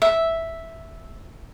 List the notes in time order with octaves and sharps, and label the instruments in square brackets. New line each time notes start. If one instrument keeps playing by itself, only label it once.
[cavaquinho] E5